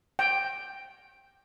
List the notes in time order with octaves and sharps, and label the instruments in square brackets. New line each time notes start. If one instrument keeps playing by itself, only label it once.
[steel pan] G5